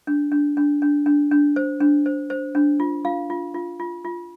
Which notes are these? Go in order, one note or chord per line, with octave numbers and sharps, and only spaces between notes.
D4
D4
D4
D4
D4
D4
C5
D4
C5
C5
D4
F4
F4 F5
F4
F4
F4
F4